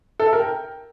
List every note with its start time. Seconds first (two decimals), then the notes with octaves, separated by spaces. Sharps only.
0.20 A4
0.26 E5
0.33 A#4
0.39 G5